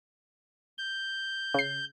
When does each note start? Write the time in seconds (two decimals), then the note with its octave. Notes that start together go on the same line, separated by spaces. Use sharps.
0.78 G6
1.54 C#3 C7